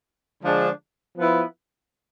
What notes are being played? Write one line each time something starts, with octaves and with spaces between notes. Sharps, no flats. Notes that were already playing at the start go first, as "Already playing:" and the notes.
D3 F3 G#3 D4 G#4
F3 B3 E4 B4